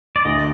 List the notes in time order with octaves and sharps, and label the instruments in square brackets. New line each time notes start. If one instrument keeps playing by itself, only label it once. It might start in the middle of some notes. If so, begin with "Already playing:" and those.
[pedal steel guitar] D5
[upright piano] D2 [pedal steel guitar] D#5